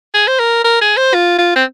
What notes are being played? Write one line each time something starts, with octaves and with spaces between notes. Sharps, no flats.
G#4
C5
A#4
A#4
G#4
C5
F4
F4
C4